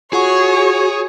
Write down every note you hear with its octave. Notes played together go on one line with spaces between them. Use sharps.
F4 F#4 G#4 C#5 F#5 C#6